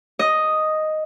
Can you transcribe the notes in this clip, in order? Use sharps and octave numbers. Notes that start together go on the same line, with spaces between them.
D#5